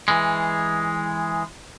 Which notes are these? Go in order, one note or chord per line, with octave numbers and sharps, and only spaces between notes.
E3 G#3